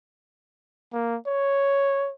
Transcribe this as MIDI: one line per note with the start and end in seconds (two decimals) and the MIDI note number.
0.93 1.17 58
1.27 2.12 73